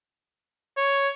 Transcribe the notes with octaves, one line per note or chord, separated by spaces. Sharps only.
C#5